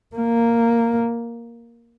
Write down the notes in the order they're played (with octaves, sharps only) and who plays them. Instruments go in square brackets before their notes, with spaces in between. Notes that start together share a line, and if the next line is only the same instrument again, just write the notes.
[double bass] A#3